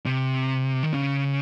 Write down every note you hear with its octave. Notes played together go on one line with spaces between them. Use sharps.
C3
D#3
C#3